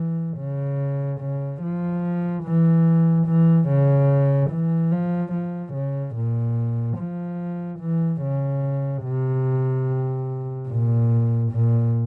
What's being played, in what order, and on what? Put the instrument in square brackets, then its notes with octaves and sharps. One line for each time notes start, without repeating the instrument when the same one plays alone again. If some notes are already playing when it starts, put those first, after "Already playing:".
Already playing: [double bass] E3
C#3
C#3
F3
E3
E3
C#3
E3
F3
F3
C#3
A#2
F3
E3
C#3
C3
A#2
A#2